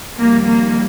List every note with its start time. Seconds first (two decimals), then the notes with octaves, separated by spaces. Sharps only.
0.17 F2 D#3 G3 A#3
0.46 A#3